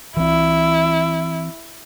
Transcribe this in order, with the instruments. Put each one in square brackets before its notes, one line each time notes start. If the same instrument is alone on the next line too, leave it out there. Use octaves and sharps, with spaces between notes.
[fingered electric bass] E3 C4 [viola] E4